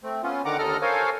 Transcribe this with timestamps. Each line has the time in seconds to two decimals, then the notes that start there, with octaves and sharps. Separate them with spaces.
0.03 A3 C4
0.23 B3 C#4 F4
0.45 D3 D#3 F#5 A#5 D6
0.59 D#2 D3 A4 D#5 A#5 F6
0.82 A4 A#4 C5 C#5 F5 G#5